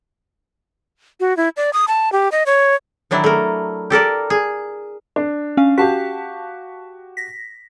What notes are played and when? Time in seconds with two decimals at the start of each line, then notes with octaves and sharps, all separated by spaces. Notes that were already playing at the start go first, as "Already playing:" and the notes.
1.20 F#4
1.37 E4
1.57 D5
1.73 D#6
1.88 A5
2.12 G4
2.32 D#5
2.46 C#5
3.11 D#3 F#3 D4 E4
3.24 A3 A#4
3.90 G4 A4 A#4 D5
4.30 G#4
5.16 D4
5.57 C#4 F5
5.78 F#4 G4 F5 A5 B6
7.17 A#6 B6